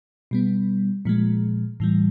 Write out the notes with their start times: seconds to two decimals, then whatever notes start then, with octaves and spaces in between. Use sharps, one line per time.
0.31 B2 G3 B3
1.05 A#2 F3 G#3
1.80 A2 E3 G3